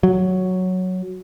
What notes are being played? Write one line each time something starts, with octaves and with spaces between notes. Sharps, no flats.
F#3